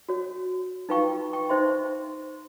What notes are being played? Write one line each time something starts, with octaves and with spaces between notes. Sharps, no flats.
F#4 C#5
D#4 F4 B4 F5 G5 C#6
G5 C#6
D#4 C5 E5 C6